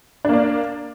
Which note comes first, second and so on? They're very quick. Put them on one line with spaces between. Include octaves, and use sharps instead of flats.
D4 A#3 D5